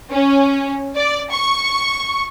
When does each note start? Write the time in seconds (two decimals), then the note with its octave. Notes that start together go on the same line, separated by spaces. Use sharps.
0.11 C#4
0.96 D5
1.30 C#6